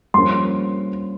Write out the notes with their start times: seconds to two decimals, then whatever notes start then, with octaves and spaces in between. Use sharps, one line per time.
0.14 G2 F3 A#3 C#4 C6